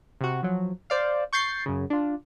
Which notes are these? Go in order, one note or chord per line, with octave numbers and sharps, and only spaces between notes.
C3 F#4
F3 F#3
C5 D5 F5
C#6 G6 A6 C7
F#2 C#3
D4 F4